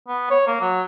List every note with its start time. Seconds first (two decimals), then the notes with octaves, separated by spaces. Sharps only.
0.07 B3
0.30 C#5
0.47 A#3
0.61 F#3